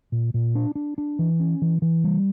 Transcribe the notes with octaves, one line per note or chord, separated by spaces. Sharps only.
A#2
A#2
D4
D4
D4
E3
C#4
E3
E3
G3